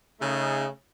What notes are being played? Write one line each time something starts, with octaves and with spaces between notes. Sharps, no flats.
C#3 A3 D#4